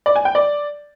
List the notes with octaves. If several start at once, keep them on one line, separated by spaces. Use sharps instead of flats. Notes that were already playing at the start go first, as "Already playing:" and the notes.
D5
G#5
G5
D5